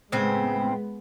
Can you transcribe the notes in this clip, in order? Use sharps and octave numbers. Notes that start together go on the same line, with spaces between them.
A2 C#3 G#3 B3 C4